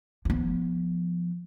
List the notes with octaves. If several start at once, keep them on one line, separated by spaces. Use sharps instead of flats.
F3 B3